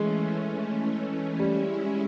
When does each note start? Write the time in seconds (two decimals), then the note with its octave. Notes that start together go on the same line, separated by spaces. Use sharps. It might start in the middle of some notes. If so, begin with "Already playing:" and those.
Already playing: E3 G#3 A3 C#4
1.39 G3 G#3 C#4 E4